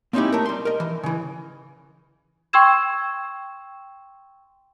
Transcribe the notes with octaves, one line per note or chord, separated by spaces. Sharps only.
A#3 C4 C#4 D#4 E4 G4
A3 A#4
G3 C6
A#4 D#5
E3
C#3 E3
G5 C6 C#6 E6 G#6 E7